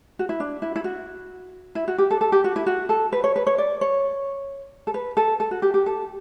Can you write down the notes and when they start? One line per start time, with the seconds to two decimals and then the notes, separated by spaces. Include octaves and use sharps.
0.19 F#4
0.29 E4
0.40 D4
0.62 E4
0.76 E4
0.84 F#4
1.75 E4
1.88 F#4
1.98 G4
2.11 A4
2.21 A4
2.32 G4
2.44 F#4
2.56 E4
2.66 F#4
2.89 A4
3.12 B4
3.24 C#5
3.36 B4
3.47 C#5
3.58 D5
3.81 C#5
4.87 A4
4.94 B4
5.17 A4
5.40 A4
5.51 F#4
5.62 G4
5.74 G4
5.86 A4